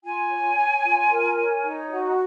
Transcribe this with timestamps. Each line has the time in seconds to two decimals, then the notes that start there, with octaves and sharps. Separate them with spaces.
0.03 F4 G#5
0.29 C#5
0.56 C#5
0.83 F4
1.10 A#4
1.36 C#5
1.63 D#4
1.90 F#4